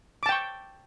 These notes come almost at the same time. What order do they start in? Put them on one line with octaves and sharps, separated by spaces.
D6 A5 G5 C#6